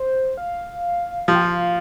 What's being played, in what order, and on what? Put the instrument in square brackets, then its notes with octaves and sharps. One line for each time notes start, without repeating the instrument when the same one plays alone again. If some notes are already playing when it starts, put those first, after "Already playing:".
Already playing: [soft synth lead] C5
F5
[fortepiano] F3 [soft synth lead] F5
[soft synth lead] G5
F5